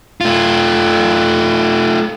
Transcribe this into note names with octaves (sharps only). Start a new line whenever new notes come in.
A3 F4